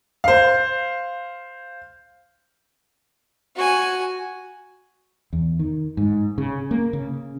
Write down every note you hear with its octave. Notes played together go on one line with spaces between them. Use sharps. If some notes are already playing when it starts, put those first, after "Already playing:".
C5 F5
F#4 G#5
E2
D#3
G#2
C#3
A#3
C#3